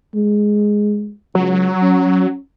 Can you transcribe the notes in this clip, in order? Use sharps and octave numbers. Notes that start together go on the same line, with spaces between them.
G#3
C#2 F#3
C#4